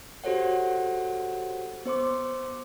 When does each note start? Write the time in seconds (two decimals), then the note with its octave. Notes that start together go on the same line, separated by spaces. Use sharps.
0.24 F#4 G4 A4 C5 C#5 F#5
1.86 B3 C5 C6 D6